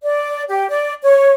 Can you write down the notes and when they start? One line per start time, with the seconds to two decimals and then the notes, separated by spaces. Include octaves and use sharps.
0.02 D5
0.48 G4
0.69 D5
1.03 C#5